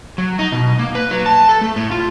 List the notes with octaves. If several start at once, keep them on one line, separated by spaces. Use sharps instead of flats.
F#3
D#4
B2
A#3
B4
F#3
A5
A4
A3
A2
F4